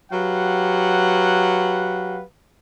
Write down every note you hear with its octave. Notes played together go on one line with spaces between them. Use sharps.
F#3 G4 B4 F5 F#5